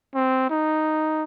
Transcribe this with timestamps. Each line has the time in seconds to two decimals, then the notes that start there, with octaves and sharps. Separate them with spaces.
0.15 C4
0.50 D#4